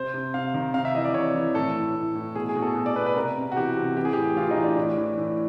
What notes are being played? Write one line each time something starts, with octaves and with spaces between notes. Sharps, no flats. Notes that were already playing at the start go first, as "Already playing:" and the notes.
Already playing: C3 C5
C3
C3 F5
D#3
C3 F5
E5
E3 D#5
D5
C3 C#5
E3
A2 A4
A2
A2
A2
B2 G#4
G#4
B2
A4
B2
D5
B2 B4
B4
C3 A#4
C3
F#4
E3 G4
C3
E3 G4
G#4
G4
A2
E3 F4
D#4
A2
D4
A2
E3
A2